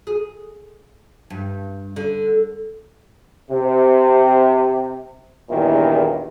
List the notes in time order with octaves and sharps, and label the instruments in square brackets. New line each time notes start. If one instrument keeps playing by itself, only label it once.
[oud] G#4
G2
D3
[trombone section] C3
A#1 E2 G2 A#2 D#3 E4